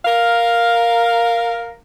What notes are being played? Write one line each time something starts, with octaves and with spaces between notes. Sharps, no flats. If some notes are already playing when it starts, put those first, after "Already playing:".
A#4 F5